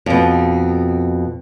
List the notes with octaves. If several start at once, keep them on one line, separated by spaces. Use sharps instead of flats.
F2 B2